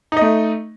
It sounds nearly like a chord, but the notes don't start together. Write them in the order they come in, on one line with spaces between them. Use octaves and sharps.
D#4 D#5 A3